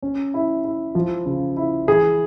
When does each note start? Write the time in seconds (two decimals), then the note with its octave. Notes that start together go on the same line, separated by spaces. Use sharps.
0.03 C#4
0.34 E4
0.64 E4
0.95 F3
1.26 C#3
1.57 E4
1.87 E3 G#4